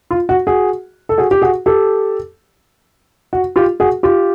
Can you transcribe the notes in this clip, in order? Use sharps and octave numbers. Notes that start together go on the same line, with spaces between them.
F4
F#4
F#4 G#4
A4
F#4 G#4
G4
F#4 G#4
G4 A4
F#4
F4 G4
F#4 G#4
F4 G4